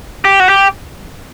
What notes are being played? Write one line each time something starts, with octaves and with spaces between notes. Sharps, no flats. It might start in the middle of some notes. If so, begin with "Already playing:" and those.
G4
F#4
G4